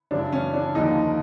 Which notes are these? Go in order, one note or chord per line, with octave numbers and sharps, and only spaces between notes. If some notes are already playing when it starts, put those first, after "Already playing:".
F#2 C#3 E3 D4
C#4
D4
D#2 D3 F3 D#4